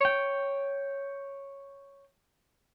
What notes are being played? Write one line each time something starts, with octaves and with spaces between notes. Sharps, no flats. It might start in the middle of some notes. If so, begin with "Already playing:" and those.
C#5 G5